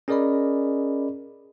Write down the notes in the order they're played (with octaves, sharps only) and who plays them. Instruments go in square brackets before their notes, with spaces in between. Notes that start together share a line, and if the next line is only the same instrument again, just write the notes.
[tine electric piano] C#4 G#4 A#4 D5 D#5 B5